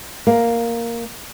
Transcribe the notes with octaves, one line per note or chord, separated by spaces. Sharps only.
A#3